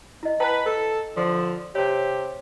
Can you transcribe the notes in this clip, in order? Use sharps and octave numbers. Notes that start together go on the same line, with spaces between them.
E4 D#5
B4 G5 A5 A#5
A4
D3 F3
C3 G4 C#5